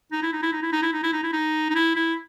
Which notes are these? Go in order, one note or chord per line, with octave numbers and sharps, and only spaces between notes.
D#4
E4
D#4
E4
D#4
E4
D#4
E4
D#4
E4
D#4
E4
D#4
D#4
E4
E4